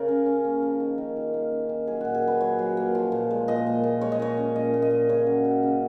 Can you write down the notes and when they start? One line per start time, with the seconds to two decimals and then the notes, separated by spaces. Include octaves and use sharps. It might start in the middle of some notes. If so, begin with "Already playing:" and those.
Already playing: C#3 A#4 C#5 F5
0.08 C#4
0.26 C#4
0.44 A#3
0.63 F3
0.80 D#3
0.98 D#3
1.16 D#3
1.34 A#3
1.51 C#4
1.69 D#3
1.87 F#3 G#4
2.01 A#2 F#4
2.15 G#4
2.23 F#3 B4
2.41 F#3 C#5
2.59 F#3
2.77 A#3
2.95 F3
3.12 A#2
3.31 G#3
3.48 A#2 D#5
3.67 A#2
3.84 A#2
4.01 G#3 C#5
4.12 D#5
4.19 A#2 C#5
4.37 C#4
4.56 A#2 D#5
4.74 A#2
4.82 D#5
4.91 A#2
5.09 C#3 C#5
5.27 F#3
5.45 F#3
5.63 C#3